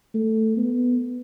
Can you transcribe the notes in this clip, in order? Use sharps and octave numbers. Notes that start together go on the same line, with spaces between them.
A3
B3